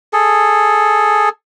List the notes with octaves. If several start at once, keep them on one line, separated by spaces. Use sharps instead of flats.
G#4 A4